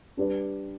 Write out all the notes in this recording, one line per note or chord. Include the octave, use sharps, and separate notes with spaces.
G3 D4 G4 B4 D5